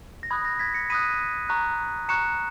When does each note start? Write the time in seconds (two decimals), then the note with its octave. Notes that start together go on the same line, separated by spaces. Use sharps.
0.23 A#6
0.30 B5 D#6 F#6 G#6
0.45 A#6
0.59 G#6 B6
0.74 A#6 C#7
0.90 B5 D#6 F#6 B6 D#7
1.49 A#5 C#6 F#6
2.09 A#5 C#6 F#6 C#7 E7